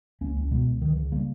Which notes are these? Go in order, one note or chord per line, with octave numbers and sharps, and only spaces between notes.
C#2 A#3 C#4
C#2
B2 G#3 B3
C#2
C#2 D#3
E3
C#3
C#3 G3 A#3